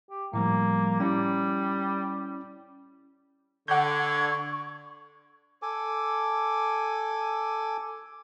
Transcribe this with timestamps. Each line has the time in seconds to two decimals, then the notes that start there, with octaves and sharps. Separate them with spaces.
0.10 G4
0.34 A2 F3 G3 A#3
1.00 G3 C#4 E4
3.68 D3 F#5 C#6 G6 G#6
5.62 A4 G#5 D6